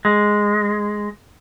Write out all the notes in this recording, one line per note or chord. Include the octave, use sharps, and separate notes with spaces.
G#3